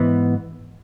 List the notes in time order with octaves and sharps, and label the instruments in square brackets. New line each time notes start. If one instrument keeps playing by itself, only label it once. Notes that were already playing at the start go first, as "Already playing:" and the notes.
Already playing: [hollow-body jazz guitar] G#2 E3 B3